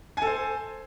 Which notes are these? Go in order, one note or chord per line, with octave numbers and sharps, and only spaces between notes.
A4 C5 G#5